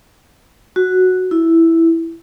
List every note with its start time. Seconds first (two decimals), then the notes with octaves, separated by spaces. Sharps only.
0.76 F#4
1.31 E4